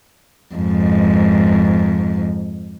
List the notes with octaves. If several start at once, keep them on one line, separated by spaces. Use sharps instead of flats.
F2 G#2